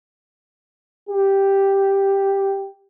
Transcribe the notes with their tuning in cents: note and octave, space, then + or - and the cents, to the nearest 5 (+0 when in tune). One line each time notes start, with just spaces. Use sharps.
G4 +0